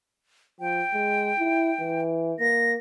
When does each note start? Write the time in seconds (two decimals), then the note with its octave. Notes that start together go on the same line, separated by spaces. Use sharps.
0.60 F3 G5
0.94 G#3
1.39 E4
1.80 E3
2.40 A#3 A#6